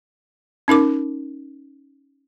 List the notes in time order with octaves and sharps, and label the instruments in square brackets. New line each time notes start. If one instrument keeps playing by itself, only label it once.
[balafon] C#4 D#4 A#4 D6